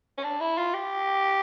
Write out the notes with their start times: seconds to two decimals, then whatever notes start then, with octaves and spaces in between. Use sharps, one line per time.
0.18 C#4
0.24 D4
0.41 E4
0.58 F4
0.74 G4